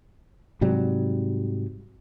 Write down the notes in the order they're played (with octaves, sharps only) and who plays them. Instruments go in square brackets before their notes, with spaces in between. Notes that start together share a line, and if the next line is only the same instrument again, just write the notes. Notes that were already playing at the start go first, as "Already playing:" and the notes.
[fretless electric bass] G#2 C3 F#3 G3